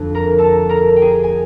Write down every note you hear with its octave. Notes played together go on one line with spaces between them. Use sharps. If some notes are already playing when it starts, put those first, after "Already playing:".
Already playing: F2 D3
A#4 A#5
A4 A5
A#4 A#5
G5
G#4 G#5
G#5